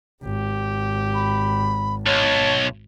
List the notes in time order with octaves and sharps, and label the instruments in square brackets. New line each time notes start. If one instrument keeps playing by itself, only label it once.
[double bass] G#1 [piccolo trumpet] G4
[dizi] B5
[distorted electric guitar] B1 [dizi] C#5 [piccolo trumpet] A5